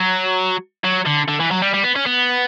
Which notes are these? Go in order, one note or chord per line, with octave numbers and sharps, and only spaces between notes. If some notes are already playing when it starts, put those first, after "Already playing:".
Already playing: F#3
F#3
D3
D3
E3
F#3
G3
G3
B3
C#4
B3